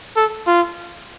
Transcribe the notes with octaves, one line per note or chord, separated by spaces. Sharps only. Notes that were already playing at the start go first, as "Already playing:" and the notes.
A4
F4